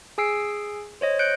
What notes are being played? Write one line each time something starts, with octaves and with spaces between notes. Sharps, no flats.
G#4 G#5 E6 C7 D7
C5 C#5 D#5
F#6 G6 C#7 D7